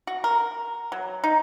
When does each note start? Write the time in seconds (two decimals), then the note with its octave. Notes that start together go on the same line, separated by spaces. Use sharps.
0.07 F#4
0.24 A#4
0.92 F#3
1.24 D#4